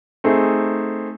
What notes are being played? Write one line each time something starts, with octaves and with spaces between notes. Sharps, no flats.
A3 C4 D#4 G#4